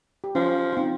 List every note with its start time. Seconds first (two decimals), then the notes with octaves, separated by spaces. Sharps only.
0.24 G4
0.35 F3 C#4 F4
0.73 F4
0.77 C4 D#4